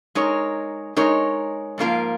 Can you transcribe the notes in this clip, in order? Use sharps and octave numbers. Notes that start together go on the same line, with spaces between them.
G#3 D#4 A#4 C#5
G#3 D#4 A#4 C#5
G#2 F3 A#3 F4 A#4